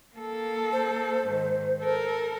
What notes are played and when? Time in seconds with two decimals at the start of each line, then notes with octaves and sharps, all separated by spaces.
0.16 A#3 A4
0.72 C5
1.26 G#2 D#3
1.80 A4 A#4